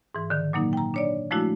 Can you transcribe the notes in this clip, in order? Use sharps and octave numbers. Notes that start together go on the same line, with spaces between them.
G#2 E3
D3 D#3
A#2 F#3 A#3 D#4
G5 A#5
D4 C#5 D5
F3 G#3 A3 D4 E4 F#4